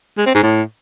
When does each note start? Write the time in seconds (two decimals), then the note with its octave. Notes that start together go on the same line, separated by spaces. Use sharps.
0.18 G#3
0.26 C4
0.35 G#2
0.43 A2